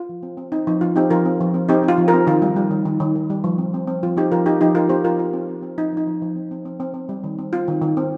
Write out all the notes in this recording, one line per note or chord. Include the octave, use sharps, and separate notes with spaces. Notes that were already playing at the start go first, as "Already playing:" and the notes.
Already playing: F4
F3
C4
C4
C4 D#4
F3 D#4
F3 F4
C4 D#4 G4
F3 F4 A#4
C4
F3
C4
C4 D#4 G4
C4 F4
F3
F4 A#4
C4
D#3 F4
G3
G3
D#3
D#3
D#3
D#3
G3
F3
C4
C4
C4
F3 F4
C4 D#4 G4
F3 F4 A#4
F3 D#4 G4
F3 D#4 G4
F3 F4 A#4
C4 G4 C5
F3 F4 A#4
F3 F4
C4
C4
C4
F3 D#4
F3 D#4
F3
F3
C4
C4
C4
C4
C4
G3
D#3
C4
C4 F4
D#3
D#3
C4